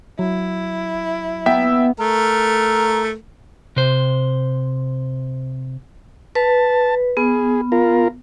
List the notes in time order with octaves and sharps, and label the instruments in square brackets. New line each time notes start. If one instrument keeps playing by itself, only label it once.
[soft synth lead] F#3 [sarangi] E4
[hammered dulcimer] B3 [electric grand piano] E5 G5 E6
[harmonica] A3 A#4
[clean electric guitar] C3 C5
[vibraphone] B4 [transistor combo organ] A5
[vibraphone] B3 [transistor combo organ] G#4
[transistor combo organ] F4 A#4